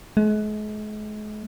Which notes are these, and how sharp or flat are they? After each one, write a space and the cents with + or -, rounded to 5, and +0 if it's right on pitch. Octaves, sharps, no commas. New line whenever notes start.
G#3 +40